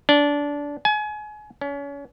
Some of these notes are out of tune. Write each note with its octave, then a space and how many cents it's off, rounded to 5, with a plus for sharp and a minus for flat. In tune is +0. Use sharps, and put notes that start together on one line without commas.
D4 -20
G#5 +30
C#4 +35